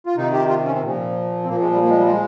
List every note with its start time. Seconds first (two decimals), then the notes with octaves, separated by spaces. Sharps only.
0.06 F4
0.17 C3 D#3 D#4
0.33 G4
0.49 F4
0.66 C#4
0.75 C4
0.82 A#2 F3
1.44 C4
1.49 A#2 F3 A#3
1.61 G#3
1.72 G3
1.82 A#3
1.90 G#3
1.98 G3
2.06 G#3